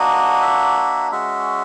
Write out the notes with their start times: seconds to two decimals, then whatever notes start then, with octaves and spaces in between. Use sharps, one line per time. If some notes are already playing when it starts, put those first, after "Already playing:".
Already playing: A#3 D4 F#4 D#5
0.41 E5
1.12 G#3 C#4 F#4 E5